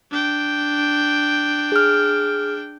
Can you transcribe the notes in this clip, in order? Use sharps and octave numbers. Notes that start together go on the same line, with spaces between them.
D4 G5
G#4 F6